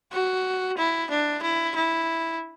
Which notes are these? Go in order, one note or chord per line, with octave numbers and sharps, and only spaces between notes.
F#4
E4
D4
E4
E4